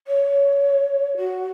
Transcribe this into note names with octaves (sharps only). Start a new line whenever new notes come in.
C#5
F#4